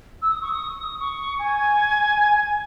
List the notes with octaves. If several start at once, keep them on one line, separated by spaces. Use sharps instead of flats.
E6
D#6
C#6
D#6
C#6
G#5